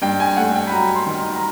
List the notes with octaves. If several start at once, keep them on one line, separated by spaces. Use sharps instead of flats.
G2 G5
G#5
A3 F#5
G5
B5
F#3 A#5
C6
D#3
A#5